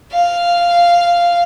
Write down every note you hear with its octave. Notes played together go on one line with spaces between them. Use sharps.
F5